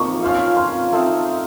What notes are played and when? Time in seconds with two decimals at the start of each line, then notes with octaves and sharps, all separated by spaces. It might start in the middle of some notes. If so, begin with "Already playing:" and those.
Already playing: F3 A#3 D#4 C#6
0.23 C#4 F4 C5 F5
0.57 C6
0.93 A3 C4 D#4